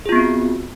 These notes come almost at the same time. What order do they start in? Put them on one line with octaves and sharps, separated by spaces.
G#4 F4 B3 C4 F#4